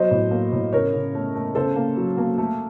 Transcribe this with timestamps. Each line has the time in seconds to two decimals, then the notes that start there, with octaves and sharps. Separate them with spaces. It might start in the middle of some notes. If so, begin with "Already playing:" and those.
Already playing: F#3 C5 D#5
0.11 A2
0.31 A#3
0.52 A2
0.72 C#3 A#4 C#5
0.93 C#3
1.15 A3
1.35 A3
1.55 C#3 A4 C5
1.76 A#3
1.97 F#3
2.17 A#3
2.38 A3